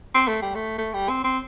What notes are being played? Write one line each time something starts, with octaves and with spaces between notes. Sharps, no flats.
C4
A3
G3
A3
A3
G3
C4
C4